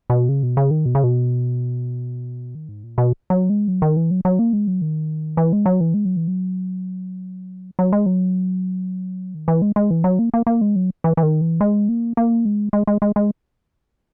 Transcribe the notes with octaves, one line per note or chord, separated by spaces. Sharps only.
B2
C#3
B2
C#3
D#3
B2
C#3
B2
D#3
G#2
A#2
B2
F#3
G#3
F#3
D#3
E3
F#3
F#3
A#3
G#3
F#3
D#3
E3
G#3
F#3
E3
G#3
F#3
E3
F#3
F#3
G#3
F#3
D#3
E3
G#3
G#3
E3
F#3
A#3
A#3
A#3
G#3
F#3
E3
E3
D#3
E3
G#3
A#3
A#3
G#3
G#3
G#3
G#3
G#3